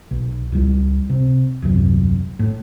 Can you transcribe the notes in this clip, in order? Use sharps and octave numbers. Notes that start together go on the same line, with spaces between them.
B1
C#2 G3
C3
D#1 C2 F#2
A2